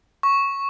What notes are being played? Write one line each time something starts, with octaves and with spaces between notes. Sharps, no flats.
C#6